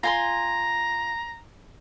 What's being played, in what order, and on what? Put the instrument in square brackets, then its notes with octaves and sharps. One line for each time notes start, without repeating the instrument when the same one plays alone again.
[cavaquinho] F4 G#5 C6 [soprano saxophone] A#5